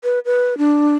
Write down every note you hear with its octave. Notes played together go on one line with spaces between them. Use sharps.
B4
B4
D4